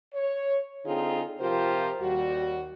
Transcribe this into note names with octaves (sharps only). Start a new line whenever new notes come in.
C#5
D3 C4 D#4 F4 G#4
C3 F3 F4 G4 A#4 C5
D#2 G3 F#4